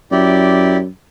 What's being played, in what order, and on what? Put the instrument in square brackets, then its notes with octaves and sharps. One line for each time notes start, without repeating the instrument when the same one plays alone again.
[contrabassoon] F#2 [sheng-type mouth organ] E4 G4 D5